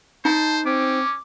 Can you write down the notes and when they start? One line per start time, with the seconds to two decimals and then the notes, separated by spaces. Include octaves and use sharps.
0.25 D#4 C5 A5
0.66 C4 C#4 D6